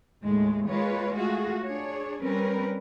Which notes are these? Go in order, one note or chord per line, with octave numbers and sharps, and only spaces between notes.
D#2 A2 G#3 A3
G#3 A#3 F4 B4 C#5
A3 F4 F#4 G#4
D4 G#4 C#5
G3 C4 C#4 A#4 B4